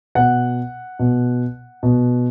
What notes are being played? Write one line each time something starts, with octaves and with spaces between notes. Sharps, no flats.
B2 F#5
B2
B2